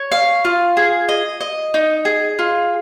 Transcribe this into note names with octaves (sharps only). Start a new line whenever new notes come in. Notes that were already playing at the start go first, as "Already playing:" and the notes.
Already playing: C#5
F5
F4
G#4
D#5
D#5
D#4
G#4
F4